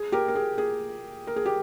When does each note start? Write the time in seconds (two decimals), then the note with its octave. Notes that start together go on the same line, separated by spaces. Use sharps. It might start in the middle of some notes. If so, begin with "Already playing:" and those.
Already playing: G#4
0.12 G4 A#4
0.28 A#4
0.35 G#4
0.58 G#4
1.27 A#4
1.36 G#4
1.46 G4